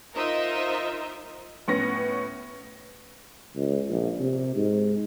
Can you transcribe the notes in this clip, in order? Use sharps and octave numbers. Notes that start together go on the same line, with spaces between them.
D#4 F4 A#4 C5 D#5 E5
A2 B3 C#4 A#6
C#2
A#1
C3
G#2